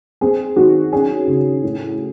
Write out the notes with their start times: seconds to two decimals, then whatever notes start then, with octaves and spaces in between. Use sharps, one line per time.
0.21 C4 G#4
0.56 D#3 F#4
0.93 C#4 G#4
1.27 C#3
1.63 A2